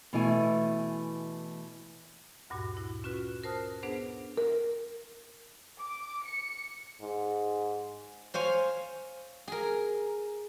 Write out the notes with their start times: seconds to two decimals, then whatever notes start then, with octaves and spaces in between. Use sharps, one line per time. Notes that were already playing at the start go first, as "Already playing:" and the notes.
0.13 B2 E3 A3 E4 G#5
2.50 D2 G2 A#2 F#4
2.77 E4
3.04 C#4 F4 F#4 B4
3.44 A#4 C5 A5 D#6 F6 F#6
3.83 B3 D4 G#4 B4 C5 F#5
4.37 A#4
5.79 D6
6.24 C#7
7.01 G#2
8.34 C5 C#5 F5 G#5
9.48 G#4 A#4